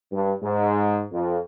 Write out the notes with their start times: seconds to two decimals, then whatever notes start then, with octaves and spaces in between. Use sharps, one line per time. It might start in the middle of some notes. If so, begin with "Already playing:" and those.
0.12 G2
0.43 G#2
1.12 F2